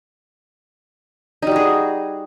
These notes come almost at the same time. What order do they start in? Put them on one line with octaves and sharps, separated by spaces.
D#4 G3 F#4 G#4